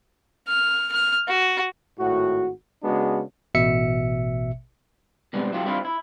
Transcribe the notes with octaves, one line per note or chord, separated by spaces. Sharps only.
F6
F6
F#4
G#1 A2 F#4
C#3 G#3 B3 D4 F#4
A1 B2 E5 C#7
B2 G3 G#3 B3 C4
F#3 E4 F4 G4
G2 G3 C4 E4 F4
E4